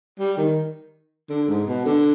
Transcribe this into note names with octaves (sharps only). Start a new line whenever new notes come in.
G3
D#3
D3
G#2
B2
D3